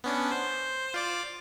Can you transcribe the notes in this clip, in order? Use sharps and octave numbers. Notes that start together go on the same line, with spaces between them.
B3 C#4 D4
C5
F4 D5 D6